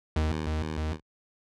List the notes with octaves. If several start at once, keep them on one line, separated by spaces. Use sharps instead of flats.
D#2